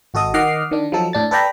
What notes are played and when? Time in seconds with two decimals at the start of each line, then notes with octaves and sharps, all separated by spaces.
0.14 G#1 F#4 A4 D#5 D#6
0.34 D#3 D#5 F#5 D6 F6 C7
0.71 D#3 D4
0.92 F3 F#3 D#4 A4
1.13 A2 D4 A6
1.31 A4 B4 D5 G5 A#5 B5